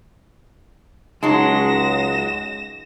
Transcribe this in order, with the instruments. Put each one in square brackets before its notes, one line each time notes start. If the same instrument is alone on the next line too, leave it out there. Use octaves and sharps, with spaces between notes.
[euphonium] C#2 [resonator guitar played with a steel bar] F#3 G#3 [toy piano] D#4 G#4 [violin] A#6 E7